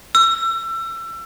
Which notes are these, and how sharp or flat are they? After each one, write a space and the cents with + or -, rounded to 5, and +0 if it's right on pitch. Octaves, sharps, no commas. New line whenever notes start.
E6 +30